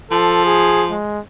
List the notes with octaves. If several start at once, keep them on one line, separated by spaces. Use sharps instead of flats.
F3 A4
G#4
G#3